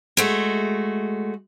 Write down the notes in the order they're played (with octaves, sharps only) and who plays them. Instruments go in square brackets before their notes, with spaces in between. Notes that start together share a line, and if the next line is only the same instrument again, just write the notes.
[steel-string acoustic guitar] G#3 A3 F#4